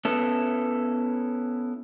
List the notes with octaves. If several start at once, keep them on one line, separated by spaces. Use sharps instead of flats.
B3 C#4 E4 A4